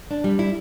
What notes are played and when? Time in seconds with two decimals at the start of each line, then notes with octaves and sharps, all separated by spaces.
0.11 D4
0.24 G3
0.39 E4